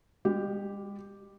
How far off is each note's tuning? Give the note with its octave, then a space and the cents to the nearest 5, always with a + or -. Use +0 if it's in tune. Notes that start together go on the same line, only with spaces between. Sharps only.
G#3 -45 G4 +0